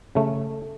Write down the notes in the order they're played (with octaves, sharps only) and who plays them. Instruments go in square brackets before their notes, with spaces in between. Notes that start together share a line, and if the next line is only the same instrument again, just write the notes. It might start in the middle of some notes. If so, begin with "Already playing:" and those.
[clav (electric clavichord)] C#3 A3